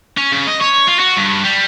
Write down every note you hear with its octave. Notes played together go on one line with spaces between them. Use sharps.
C#4
C#3
D#5
C#5
F4
F#4
G2
G3